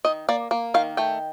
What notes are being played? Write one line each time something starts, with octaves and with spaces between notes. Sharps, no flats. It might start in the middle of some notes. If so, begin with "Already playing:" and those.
D#3 D#5
A#3 D5
A#3
D#3 F5
A3 G5